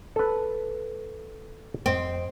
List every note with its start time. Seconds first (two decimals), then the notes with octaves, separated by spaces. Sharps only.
0.16 A4 B4
1.86 F2 C4 D#5